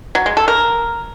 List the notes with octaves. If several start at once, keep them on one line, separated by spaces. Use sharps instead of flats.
F#3
G#3
A4
A#4